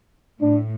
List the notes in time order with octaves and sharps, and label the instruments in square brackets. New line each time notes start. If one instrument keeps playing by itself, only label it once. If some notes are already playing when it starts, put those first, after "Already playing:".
[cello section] A2 [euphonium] D4